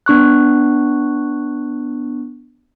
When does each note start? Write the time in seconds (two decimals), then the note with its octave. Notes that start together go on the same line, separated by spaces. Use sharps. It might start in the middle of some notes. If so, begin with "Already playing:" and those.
0.06 B3 D4 C#6 F#6